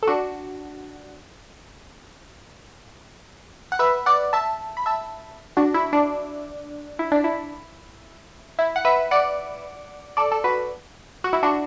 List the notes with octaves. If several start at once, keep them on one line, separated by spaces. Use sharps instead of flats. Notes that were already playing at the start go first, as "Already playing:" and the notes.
A4
D4 F#4
F#5
B4 E5
D5 F#5
E5 A5
B5
E5 A5
D4 F#4
E4
D4
E4
D4
E4
E4
F#5
B4 E5
D5 F#5
A4 D5
A4
F#4 B4
F#4
E4
D4 F#4